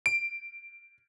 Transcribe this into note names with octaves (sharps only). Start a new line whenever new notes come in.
D7